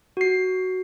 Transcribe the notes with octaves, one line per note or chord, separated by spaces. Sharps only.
F#4 C7